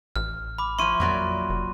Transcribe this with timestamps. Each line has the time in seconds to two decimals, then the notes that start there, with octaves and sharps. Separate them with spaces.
0.16 A1 F6
0.58 B5 D6
0.79 F3 E4 C6 C#6 D#7
1.00 F2 A#2 F#3 D5
1.49 F1